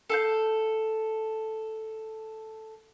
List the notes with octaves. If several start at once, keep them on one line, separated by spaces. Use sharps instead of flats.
A4 F5 G6